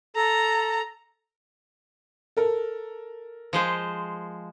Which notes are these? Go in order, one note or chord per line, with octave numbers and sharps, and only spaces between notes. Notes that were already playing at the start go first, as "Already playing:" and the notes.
A4 A#5
A4 A#4
F3 G#3 C5